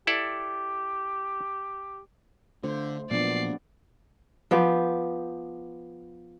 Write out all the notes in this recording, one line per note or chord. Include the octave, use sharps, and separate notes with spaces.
E4 G4 A4 D5
D3 A3 F4 C5
A#2 F3 F#3 B3 D4 D5 C7
F3 B3 G4